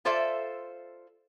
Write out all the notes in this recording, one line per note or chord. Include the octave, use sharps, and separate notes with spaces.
F4 A4 C5 D5 E5